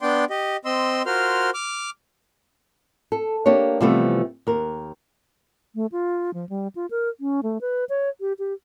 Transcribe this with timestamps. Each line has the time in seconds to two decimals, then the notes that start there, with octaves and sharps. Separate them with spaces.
0.01 B3 D4 D5 G5 C6
0.30 G4 D#5
0.65 C4 D#5 C6 E6
1.06 F4 F#4 A#4 C5 C6 F6
1.54 D6 F6
3.12 A4
3.46 A#3 D4 G4 C#5
3.81 C3 E3 F3 G3 A3 B3
4.47 D#2 A#4
5.75 A3
5.92 F4
6.34 F3
6.49 G3
6.75 F4
6.91 A#4
7.20 C#4
7.43 A3
7.61 B4
7.89 C#5
8.21 G4
8.39 G4